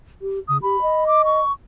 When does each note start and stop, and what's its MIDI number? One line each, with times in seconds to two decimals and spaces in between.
0.21 0.39 67
0.48 0.61 49
0.48 0.57 87
0.62 0.79 67
0.62 1.05 83
0.81 1.39 75
1.07 1.22 86
1.25 1.52 85